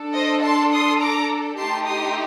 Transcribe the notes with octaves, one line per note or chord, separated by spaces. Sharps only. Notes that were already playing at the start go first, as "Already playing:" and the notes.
Already playing: D4 A4
C5 D#5
A5 C6
C6 D#6
A#5 D6
A3 D#4 G4 A5 C6
C6 D#6